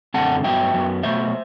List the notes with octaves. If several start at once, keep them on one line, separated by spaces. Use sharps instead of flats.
F#2 D3 A3 C4 F#5 A5
G2 F#3 B3 E5 G5
F#2 F#3 B3
B2 F#3 A3 C5 E5